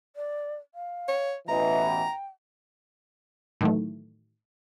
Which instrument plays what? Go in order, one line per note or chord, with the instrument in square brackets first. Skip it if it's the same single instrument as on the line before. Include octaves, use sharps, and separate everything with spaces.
[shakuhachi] D5
F5
[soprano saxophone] C#5
[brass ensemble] A1 B2 E3 [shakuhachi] D#5 [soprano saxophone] A#5
[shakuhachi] G5
[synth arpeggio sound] A2 D#3 E3 F#3 A3